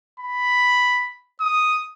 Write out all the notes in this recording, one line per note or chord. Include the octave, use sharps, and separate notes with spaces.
B5
D#6